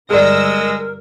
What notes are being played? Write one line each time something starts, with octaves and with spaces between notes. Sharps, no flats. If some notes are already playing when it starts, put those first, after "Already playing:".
G1 G#3 G#4 A#4 D5 E6 A#6